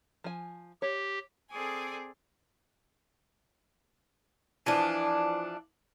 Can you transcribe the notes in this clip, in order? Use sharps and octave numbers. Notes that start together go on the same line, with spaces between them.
F3 G#5
G4 C#5
C4 G#4 A4 D5 G#5 D#6
E3 F3 D4